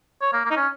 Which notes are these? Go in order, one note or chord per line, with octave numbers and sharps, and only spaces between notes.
C#5
A#3
A#3
D#4
C#4